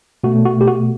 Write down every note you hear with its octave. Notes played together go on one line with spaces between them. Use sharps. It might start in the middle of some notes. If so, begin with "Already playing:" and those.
B2 A3 F#4
F#4
G4
F#4